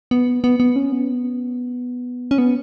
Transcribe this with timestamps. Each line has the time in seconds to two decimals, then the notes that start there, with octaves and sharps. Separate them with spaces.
0.11 B3
0.44 B3
0.60 B3
0.76 C#4
0.92 B3
2.31 C#4
2.38 B3